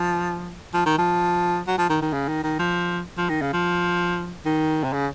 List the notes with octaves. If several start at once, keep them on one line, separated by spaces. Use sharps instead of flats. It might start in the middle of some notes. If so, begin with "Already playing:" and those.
Already playing: F3
F3
D#3
F3
F#3
F3
D#3
D#3
C#3
D#3
D#3
F3
F3
D#3
C#3
F3
D#3
C3
C#3